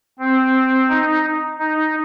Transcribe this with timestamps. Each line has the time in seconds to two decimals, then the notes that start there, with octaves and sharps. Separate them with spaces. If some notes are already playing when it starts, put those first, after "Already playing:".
0.19 C4
0.89 D#4
1.59 D#4